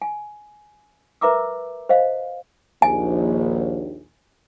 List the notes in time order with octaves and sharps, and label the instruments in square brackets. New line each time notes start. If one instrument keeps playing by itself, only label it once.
[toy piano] G#5
A#4 B4 E5 A#5 D6 E6
C5 D#5 F5
[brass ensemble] A#1 D#2 [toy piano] G#5